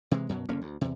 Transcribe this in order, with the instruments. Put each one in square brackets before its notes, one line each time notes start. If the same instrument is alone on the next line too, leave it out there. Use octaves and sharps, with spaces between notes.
[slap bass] C3 E3 G#3
F#2 B2 F#3
F#1 D3 A#3 C#4
D2
E2 C3